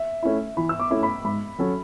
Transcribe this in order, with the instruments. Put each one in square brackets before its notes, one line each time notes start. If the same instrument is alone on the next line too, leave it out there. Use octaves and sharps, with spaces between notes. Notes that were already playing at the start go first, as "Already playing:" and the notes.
Already playing: [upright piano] E5
[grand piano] A3 C#4 E4
[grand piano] E3 [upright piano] B5
[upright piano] E6
D6
[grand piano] A3 C#4 E4
[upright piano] B5
[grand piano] G#2 [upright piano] B5
[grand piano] F#3 C#4 F#4 A4